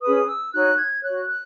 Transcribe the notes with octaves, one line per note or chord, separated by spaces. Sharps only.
C#4 G#4 B4 D#6
E6
D#4 F#4 C#5 F#6
G#6
F#4 C#5 F#6
F#6